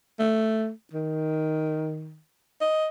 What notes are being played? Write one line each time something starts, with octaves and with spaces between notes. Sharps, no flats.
A3
D#3
D#5